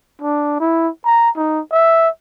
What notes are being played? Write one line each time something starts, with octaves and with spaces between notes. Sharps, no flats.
D4
E4
A#5
D#4
E5